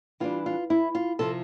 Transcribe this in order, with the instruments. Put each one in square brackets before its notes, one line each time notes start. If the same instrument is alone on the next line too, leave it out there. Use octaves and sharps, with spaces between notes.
[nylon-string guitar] E3 G3 D4 F4
F4
E4
F4
C3 F3 C4 A4